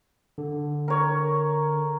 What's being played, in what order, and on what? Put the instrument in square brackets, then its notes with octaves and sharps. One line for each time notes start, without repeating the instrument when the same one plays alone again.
[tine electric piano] D3
[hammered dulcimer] A#4 C#5